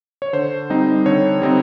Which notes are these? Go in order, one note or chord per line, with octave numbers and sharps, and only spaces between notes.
C#5
D3 C5
G3 C4 D#4
D3 C#5
G3 C4 D#4